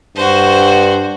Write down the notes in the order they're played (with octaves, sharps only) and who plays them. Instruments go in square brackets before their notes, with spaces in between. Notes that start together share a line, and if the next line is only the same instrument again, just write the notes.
[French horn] G2 [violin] F#4 C5